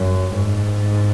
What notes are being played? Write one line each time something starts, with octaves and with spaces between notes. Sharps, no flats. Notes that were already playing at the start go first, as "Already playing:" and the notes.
Already playing: F#2
G#2